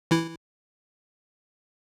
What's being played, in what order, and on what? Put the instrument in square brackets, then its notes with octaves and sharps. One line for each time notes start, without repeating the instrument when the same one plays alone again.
[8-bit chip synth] E3 E4